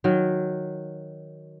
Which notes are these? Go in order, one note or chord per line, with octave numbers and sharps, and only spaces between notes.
D#3 F#3